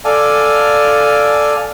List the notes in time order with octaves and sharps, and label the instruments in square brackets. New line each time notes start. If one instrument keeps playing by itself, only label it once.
[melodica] A4 D5 F5 G#5